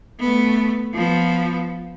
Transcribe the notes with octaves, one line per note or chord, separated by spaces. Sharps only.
A3 B3
F3 B3